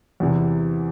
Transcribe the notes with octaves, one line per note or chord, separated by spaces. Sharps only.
E2 C3 E3